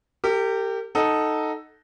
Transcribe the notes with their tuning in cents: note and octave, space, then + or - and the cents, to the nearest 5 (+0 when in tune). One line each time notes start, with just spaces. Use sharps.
G4 +0 A#4 -40
D#4 +0 A4 +0 F#5 +0